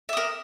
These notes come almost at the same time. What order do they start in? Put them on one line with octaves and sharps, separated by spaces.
E5 D#6 A#4